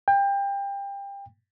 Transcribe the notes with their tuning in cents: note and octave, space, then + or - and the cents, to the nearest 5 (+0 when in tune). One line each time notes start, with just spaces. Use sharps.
G5 +25